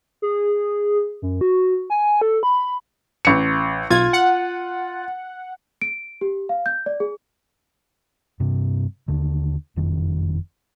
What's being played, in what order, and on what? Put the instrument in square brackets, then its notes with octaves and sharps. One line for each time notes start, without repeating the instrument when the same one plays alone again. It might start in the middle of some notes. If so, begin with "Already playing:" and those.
[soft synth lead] G#4
F#2
F#4
G#5
A4
B5
[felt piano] A1 C#7
[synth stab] B1 G#6 [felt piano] F4
[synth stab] F#5
[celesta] D7
G4
F5
G6
D5
G#4
[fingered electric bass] G2 C3
D#2 D3
F#1 F2 D#3